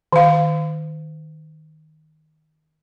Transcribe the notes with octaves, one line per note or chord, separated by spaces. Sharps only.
D#3 F5